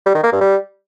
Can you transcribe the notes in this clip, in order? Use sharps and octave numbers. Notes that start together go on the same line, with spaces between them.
G3
D#3
A#3
G2
G3